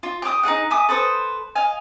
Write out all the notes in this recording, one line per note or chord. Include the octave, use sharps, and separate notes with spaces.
F4
G4 G5 D6 D#6
D#4 F4 G#4 F#5
E5 G#5 D6 D#6
A4 B4 C5 D#6
D#5 F5 G#5